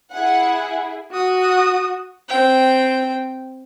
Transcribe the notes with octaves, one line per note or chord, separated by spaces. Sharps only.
E4 G#4 F#5
F#4 D#6
C4 G5